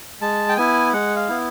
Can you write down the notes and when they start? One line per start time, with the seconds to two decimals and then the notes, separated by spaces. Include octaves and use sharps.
0.21 G#3 A5
0.49 G5
0.57 B3 E4 G#5
0.93 G#3 F#5
1.16 F5
1.29 B3 E4